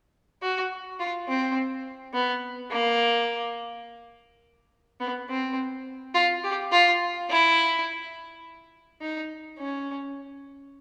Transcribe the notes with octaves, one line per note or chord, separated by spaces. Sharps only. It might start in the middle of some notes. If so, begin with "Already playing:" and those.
F#4
F4
C4
B3
A#3
B3
C4
F4
G4
F4
E4
D#4
C#4